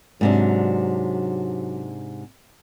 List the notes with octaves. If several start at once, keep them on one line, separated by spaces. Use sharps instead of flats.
G#2 C3 F#3 D4